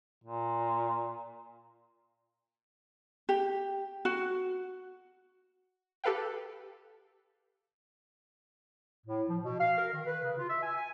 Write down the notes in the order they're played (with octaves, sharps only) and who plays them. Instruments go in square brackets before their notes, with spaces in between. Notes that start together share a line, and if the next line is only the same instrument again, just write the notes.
[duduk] A#2
[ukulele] G4
F#4
[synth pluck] G4 A4 B4 F5 G5
[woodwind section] A2
F3
B2
F5
A#4
D#3
B4
C#3
F4
E5
G#5
G#5